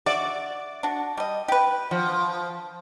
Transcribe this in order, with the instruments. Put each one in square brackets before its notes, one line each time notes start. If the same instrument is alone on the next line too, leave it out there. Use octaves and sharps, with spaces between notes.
[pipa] F#4 E5 [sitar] D5
[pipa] D4 F#4
G3 D#5
G4 B4
[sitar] F3 [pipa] F#4